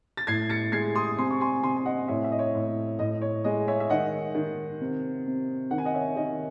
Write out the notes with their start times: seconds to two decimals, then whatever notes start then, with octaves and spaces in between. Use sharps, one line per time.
0.17 A6
0.27 A2 G#6 C7
0.50 A6 C#7
0.72 G#3 G#6 C7
0.95 C6 D#6
1.18 C3 G#5 C6
1.31 C#6
1.40 G#5 C6
1.63 C3 G#5 C6
1.76 G#5
1.85 D#5 F#5
2.08 A2 C#5 E5
2.24 E5
2.32 D#5
2.39 C#5
2.55 A2
2.99 A2 D#5
3.21 C#5
3.44 G#3 D#5
3.68 C#5 E5
3.80 E5
3.89 D#3 D#5 F#5
4.35 D#3
4.80 C3
5.26 C3
5.71 D#3 F#5
5.78 G#5
5.85 D#5 F#5
5.94 C#5 E5
6.16 D#3 D#5